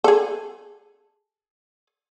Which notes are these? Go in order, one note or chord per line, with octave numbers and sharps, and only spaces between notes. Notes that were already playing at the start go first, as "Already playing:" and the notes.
G#4 A4